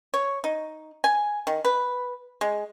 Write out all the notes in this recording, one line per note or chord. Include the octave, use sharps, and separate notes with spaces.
C#5
D#4
G#5
D#3
B4
G#3